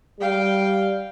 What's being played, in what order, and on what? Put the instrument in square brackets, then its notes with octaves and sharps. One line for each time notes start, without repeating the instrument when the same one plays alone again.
[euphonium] G3 [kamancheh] F5 G5